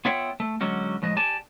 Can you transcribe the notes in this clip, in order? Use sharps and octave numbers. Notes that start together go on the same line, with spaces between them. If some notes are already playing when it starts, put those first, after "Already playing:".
B3 F4 C#5 E5 F#5 G5
A3
D3 F#3 G#3 C#4 F#4
A2 F3 G#3 D#5
G4 D5 G#5 A5